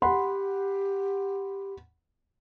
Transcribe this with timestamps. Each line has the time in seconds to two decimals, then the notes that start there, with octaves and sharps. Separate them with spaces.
0.02 G4 F#5 B5 C6